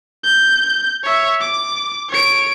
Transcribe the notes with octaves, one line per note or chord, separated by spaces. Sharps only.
G6
C#5 E5
D6
C#5 D7